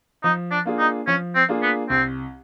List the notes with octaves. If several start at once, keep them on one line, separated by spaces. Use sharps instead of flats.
F3 D#4
D4
A#3 D4 F4 G#4
D#4
F3 C#4
C4
A#3 D4 F4 G#4
B3
C2 C4